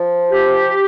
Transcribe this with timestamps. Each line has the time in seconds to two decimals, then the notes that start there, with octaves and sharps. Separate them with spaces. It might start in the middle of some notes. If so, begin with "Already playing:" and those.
Already playing: F3
0.31 G4